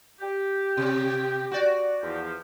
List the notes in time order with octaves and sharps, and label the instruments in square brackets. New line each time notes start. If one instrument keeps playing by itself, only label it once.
[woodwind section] G4
[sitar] C3
F#4 D5
[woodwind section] E2 F3 G4